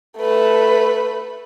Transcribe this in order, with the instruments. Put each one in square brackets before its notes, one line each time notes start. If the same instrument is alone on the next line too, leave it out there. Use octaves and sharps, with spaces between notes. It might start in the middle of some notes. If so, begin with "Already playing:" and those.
[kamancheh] A3 B4